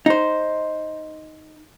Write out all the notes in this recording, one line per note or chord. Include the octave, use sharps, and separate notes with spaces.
D#4 C5